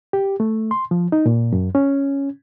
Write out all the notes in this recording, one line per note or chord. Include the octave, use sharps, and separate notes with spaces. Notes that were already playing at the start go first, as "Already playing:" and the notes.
G4
A3
C6
F3
D#4
A#2
F#2
C#4